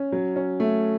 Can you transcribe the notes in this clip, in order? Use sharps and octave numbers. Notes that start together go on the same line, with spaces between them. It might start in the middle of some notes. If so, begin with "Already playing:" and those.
Already playing: C#4
F#3
C#4
A3